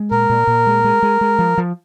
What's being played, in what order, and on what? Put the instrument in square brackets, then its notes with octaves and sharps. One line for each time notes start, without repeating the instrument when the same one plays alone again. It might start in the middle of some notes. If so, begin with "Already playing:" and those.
Already playing: [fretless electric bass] G#3
[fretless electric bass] A#2 [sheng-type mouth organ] A#4
[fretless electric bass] A#2
A#2
G#3
G#3
G#3
G#3
F3
F3